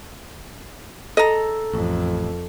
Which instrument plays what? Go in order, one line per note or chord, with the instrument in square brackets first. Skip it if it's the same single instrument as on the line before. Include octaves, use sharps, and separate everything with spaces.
[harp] A4 [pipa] D#5 A#5
[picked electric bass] A1 [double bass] F2